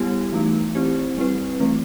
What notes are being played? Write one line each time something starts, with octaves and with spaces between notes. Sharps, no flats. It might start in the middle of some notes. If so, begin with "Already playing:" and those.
Already playing: G3 B3 E4 G4
E3 A3 D#4
C4 E4 G4 C5
G3 C4 E4 B4
E3 A3 C4